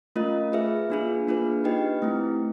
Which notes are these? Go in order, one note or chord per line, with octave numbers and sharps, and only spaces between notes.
A3 C#4 F4 A#4 D#5
F4 G#4 B4 E5
A#3 D4 F4 G#4
A#3 D4 F4 G#4 B4
D#4 G4 B4 D#5 G5
A3 C4 E4